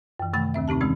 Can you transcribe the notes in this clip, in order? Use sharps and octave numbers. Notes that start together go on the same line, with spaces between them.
F#2 E3
C3 D#3 A3 F#5 B5 A6
D#2 D#3 C4 E5
C3 C4 D#4 G4 A5
D#3 E3 G#3 C4 C#4